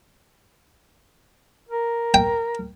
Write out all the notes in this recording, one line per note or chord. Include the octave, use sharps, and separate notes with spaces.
A#4
G5